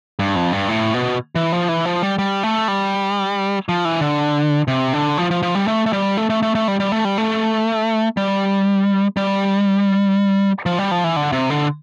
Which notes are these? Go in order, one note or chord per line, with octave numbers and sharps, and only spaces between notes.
G2
F2
G2
A2
B2
E3
F3
E3
F3
G3
G3
A3
G3
F3
E3
D3
C3
D3
F3
F3
F3
G3
A3
A3
G3
A3
A3
A3
A3
G3
G3
A3
G3
A3
G3
G3
F3
G3
F3
E3
D3
C3
D3